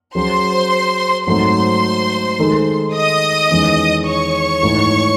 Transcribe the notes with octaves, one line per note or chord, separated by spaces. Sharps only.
F#3 C#4 G#4 C5 C6
G#2 F#3 A3 C4 C5 C6
D#3 G#3 D#4 A4
D#5 D#6
E2 D#3 G#3 C#4
C#5 C#6
G#2 E3 A3